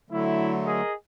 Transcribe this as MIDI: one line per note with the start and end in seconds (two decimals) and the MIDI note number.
0.11 0.81 50
0.11 0.81 54
0.11 0.81 57
0.11 0.54 64
0.63 0.93 68
0.63 0.93 70
0.63 0.93 75